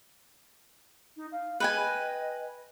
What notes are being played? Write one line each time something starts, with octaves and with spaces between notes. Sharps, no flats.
D#4
F5
B4 D#5 G5 G#5